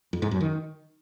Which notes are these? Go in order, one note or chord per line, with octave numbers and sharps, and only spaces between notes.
F2
G#2
F#2
D#3